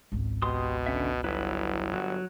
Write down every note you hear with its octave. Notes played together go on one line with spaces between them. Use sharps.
G#1 C#2
B2 G4 C6 D#6
D3 C#4 E5
G1 F#3 E4 B4
F#3 F#4